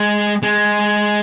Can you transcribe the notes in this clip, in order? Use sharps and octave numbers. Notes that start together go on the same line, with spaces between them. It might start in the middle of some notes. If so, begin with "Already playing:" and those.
Already playing: G#3
G#3